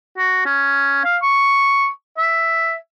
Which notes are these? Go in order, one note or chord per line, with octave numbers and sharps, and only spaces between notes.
F#4
C#4
F5
C#6
E5